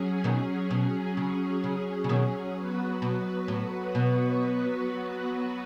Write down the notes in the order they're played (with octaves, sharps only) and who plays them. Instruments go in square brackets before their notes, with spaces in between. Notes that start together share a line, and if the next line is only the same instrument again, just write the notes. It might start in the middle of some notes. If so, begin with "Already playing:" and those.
Already playing: [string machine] F#3 C#4 G#4
[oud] B2 D#3
B2
C#3
C#3
C#3
B2 D#3
[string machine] F#3 B3 F#4 B4
[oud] B2
A2
B2